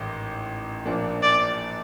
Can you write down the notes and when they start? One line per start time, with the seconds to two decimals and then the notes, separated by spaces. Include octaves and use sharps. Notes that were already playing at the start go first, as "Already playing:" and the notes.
Already playing: A1 G#2 D#3
0.85 A#1 A#2 F3 A#3 D4
1.23 D5